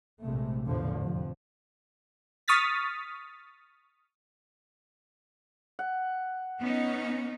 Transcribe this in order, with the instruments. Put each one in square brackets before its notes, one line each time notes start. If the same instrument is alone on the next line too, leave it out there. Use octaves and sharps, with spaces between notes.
[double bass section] A#1 A2 C3 G#3 A3
E2 A2 D3 F3
F2 C3 F3
[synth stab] C#6 D#6 F6 A6 B6
[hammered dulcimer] F#5
[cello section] B3 C#4 D#4